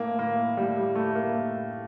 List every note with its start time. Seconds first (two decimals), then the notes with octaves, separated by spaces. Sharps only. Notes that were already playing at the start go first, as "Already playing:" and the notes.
Already playing: A2 A#3
0.19 A2 A#3
0.57 A2 G3
0.77 G3
0.96 A2 A3
1.15 A#3
1.35 A2